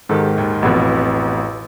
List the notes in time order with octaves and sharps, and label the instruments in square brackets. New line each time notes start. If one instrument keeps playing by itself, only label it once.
[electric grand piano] G#2 D#3 [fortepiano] G4 A4
[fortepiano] D#2
[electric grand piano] A1 [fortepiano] F2 B2 B3